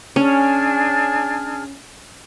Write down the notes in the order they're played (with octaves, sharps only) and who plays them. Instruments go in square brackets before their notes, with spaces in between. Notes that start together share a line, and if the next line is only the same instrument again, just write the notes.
[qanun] C#4 [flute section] D4 G#4 F6